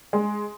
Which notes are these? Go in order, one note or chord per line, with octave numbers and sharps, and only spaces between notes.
G#3